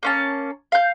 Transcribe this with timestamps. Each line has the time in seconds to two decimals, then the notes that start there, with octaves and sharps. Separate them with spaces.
0.03 A#3 C#4 A5
0.72 F5 G6